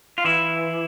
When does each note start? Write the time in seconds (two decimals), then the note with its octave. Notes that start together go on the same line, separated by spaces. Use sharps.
0.18 F4
0.24 E3 E4